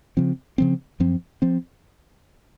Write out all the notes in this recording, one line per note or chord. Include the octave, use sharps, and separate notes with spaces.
C#3 F3 C4
C#3 F3 C4
F#2 F3 C4
F3 C4